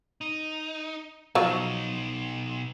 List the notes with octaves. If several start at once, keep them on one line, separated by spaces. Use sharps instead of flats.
D#4
B2 F3 F#3 D#4